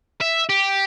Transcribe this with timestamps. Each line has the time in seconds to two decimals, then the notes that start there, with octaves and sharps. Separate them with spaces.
0.21 E5
0.49 G4